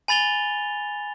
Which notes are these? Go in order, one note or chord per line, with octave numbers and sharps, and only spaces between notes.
G#5 B5 A6 F7 G7